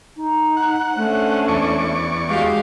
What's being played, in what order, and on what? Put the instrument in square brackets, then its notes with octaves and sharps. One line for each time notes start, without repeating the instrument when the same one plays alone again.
[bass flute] D#4
[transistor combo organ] F#5
[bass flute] A3 [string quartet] C#4 D4 C5
[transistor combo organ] E2 D5 C#6
[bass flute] G#3 [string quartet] F#4 G4 F5